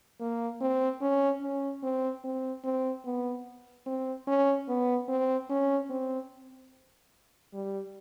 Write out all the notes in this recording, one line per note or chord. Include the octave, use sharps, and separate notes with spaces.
A#3
C4
C#4
C#4
C4
C4
C4
B3
C4
C#4
B3
C4
C#4
C4
G3